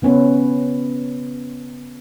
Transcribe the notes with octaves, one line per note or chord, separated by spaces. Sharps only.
C#3 B3 C#4 B4